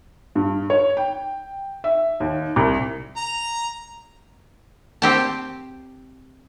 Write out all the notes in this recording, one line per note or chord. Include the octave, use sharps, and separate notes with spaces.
G2
C#5
G5
E5
D#2
C2
A#5
C4 G4 A5